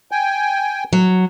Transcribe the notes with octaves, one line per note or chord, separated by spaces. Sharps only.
G5 G#5
F#3